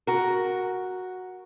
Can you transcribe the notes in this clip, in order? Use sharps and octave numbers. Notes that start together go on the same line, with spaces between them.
F#4 A#4